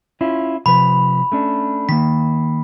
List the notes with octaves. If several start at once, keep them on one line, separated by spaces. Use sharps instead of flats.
C#4 E4 F4
C3 F3 B4 B5
A3 C#4 D4
D#3 A#3 B6